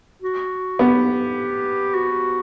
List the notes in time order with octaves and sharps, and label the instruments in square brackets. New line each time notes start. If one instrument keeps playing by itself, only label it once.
[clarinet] F#4
[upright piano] B3 [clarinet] G4
[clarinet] F#4